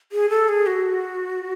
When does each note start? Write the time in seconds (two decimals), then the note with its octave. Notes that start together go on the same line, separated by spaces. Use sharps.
0.12 G#4
0.30 A4
0.49 G#4
0.66 F#4